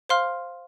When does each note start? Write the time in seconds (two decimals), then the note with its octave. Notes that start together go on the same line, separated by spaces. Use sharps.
0.09 C5 F5 C6 F6